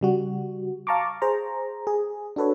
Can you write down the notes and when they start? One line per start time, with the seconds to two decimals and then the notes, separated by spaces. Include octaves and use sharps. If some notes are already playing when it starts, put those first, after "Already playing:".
0.01 C#3 G3 F#4
0.87 F5 A5 A#5 C#6 D6
1.22 G#4 C5 A#5
1.87 G#4
2.36 D4 F#4 A4 B4 C#5